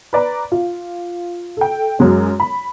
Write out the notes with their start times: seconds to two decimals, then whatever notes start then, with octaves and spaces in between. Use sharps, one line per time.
0.13 B4 D5 A#5
0.52 F4
1.57 A4 G5
1.99 F#2 F#3 G#3 C#4
2.40 B5